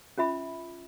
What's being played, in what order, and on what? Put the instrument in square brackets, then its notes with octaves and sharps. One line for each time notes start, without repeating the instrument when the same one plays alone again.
[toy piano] C#4 F4 E5 B5